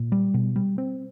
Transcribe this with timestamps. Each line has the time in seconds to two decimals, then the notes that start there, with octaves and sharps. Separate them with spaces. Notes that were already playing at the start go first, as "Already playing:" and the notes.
Already playing: A#2
0.12 G3
0.34 B2
0.56 G3
0.78 C4